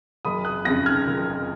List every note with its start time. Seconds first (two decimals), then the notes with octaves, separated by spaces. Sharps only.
0.25 F#1 B5 D#6
0.45 D#6 F#6
0.65 F2 C#3 F#6 A#6
0.86 F6 G#6
1.07 F#1